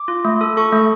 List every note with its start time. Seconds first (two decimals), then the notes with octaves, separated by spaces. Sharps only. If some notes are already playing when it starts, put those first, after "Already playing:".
Already playing: D6
0.08 F4
0.25 A3
0.41 A4
0.57 A4 C#6
0.72 A3